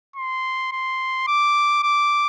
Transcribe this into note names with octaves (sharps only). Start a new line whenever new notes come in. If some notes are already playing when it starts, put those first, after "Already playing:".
C6
C6
D6
D6